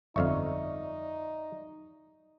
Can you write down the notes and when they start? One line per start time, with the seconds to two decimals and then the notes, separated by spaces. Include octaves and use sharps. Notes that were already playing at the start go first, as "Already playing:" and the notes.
0.16 G1 F2 D#4 D5 E5 F5 C#6